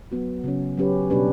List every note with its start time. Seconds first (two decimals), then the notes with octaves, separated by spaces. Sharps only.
0.12 F#3 B3 F#4
0.44 C#3 F#3 C#4
0.77 F#3 C#4 G4 B4
1.10 B2 G3 D4 G4 B4